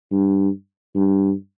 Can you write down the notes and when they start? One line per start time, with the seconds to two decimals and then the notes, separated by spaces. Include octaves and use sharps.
0.12 G2
0.95 G2